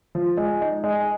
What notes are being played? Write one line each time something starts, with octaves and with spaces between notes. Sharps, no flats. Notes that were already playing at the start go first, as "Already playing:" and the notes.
F3
G#3
D#4
G#3